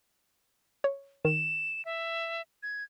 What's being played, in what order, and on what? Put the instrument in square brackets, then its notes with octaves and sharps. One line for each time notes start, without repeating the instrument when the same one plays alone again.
[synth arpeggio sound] C#5
[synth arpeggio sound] D#3 [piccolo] E7
[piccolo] E5
G#6